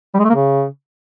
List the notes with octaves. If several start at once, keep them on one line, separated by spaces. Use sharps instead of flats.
G3
G#3
A3
A#3
C#3